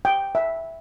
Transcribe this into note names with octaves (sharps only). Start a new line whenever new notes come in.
G5
E5